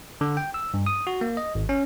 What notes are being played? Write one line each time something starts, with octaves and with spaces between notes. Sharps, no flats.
D3
G5
E6
G2
D#6
F#4
A#3
D#5
G#1
C#4